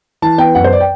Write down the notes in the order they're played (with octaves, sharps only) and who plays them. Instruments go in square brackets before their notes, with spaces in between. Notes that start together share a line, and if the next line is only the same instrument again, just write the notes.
[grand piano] E3 A5
B3 G5
F#2 F#5
C5
D5
G5